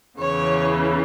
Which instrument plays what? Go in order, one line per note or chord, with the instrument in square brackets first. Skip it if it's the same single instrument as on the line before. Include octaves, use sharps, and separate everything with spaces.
[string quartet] E2 C#3 E3 C#5